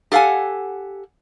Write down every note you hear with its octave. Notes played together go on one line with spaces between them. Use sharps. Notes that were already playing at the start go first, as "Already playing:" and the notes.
G4 A4 F5 F#5 G#5